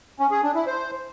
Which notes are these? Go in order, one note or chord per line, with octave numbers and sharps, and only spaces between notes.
C#4
G#4
D4
E4
C5